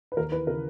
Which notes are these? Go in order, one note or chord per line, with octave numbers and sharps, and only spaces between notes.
B4
D#2 A#4
E3 B4
C#3 A#4